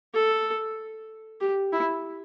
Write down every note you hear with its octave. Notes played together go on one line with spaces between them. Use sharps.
A4
G4
E4